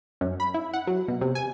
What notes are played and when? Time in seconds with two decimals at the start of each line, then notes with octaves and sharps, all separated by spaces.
0.21 F#2
0.40 B5
0.54 E4
0.73 F#5
0.87 F#3
1.08 B2
1.21 C3
1.35 G#5